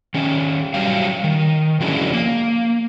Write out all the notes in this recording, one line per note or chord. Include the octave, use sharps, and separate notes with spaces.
D#3 C#4
F#3 G3 F5
D#3
F3 F#3 G#3 C#4 D4 E4
A#3